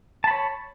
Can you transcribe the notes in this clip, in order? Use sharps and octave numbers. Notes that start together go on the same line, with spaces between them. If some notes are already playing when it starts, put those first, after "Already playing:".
C#5 A5 B5